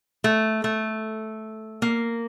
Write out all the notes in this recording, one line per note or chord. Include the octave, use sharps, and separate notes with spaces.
A3
A3
A#3